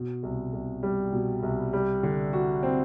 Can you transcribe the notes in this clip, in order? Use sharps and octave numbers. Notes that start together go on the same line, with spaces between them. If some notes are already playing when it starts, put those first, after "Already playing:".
Already playing: B2
C2
C2
G3
B2
C2
G3
D3
F#4
C4